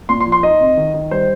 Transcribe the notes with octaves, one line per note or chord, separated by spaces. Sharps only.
A#2 C6
C6
F3
C6
D#4 D#5
C3
D#3
D#3
G3 C5